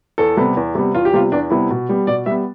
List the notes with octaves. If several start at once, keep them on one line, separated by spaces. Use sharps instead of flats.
E2 A4
C3 G3 B3
E2
C3 G3 B3
E2 F4
G4
C3 G3 B3 F4
E2 D4
C3 G3 B3 E4
B2
G3 B3
B2 D5
G3 B3 E5